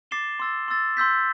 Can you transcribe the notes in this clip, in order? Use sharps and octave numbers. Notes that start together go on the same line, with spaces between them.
D6 A6 C7 E7 G7
C6 E6 A6
C6 E6 A6
C6 E6 G6 B6